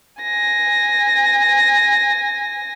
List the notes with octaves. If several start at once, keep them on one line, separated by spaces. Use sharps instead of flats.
G#5 A#6